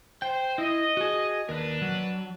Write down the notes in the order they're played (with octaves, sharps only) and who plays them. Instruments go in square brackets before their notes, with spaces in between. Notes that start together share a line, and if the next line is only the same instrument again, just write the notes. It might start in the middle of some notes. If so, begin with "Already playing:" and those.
[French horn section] C5 [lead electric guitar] G5
[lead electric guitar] E4 [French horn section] D#5
[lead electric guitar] F#4 G#4
[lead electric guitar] D#2 A#4 [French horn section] D4 B4
[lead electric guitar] F#3